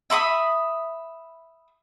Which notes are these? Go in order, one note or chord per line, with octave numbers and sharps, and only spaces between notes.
E5 B5 C#6 D#6